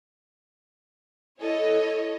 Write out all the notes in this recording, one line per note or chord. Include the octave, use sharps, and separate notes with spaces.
E4 A4 C#5 D#5